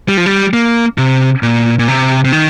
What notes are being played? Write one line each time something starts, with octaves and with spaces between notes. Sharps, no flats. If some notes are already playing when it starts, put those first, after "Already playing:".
G3
F3
G3
A#3
C3
A#2
A#2
C3
C3
D#3